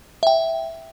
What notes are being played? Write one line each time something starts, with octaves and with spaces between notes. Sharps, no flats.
E5 G5